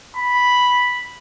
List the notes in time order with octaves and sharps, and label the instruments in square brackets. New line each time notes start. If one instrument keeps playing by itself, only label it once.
[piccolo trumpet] B5